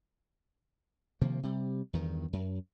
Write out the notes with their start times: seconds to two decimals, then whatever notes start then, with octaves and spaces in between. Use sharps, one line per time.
1.21 C3 D#3 F3 A#3
1.43 C3 G3
1.93 E2 G2 D#3
2.33 F#2